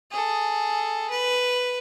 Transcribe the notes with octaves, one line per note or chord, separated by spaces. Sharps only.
G#4 A4
B4